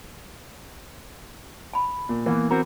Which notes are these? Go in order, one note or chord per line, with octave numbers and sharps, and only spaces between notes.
A5 B5
A#2
E3 A#3 B3
C4 F#4 A#4